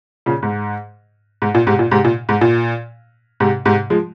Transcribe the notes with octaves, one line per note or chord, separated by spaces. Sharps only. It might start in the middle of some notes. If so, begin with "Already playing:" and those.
A#2 C#3
G#2
G#2
A#2
G#2 C3
A#2
G#2 C3
A#2
G#2
A#2
G#2 C3
G#2 C3
F3 G#3